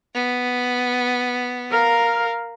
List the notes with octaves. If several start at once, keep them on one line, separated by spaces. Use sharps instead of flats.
B3
A#4 F5